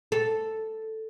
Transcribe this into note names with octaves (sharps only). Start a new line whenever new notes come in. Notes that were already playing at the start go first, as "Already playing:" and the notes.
A4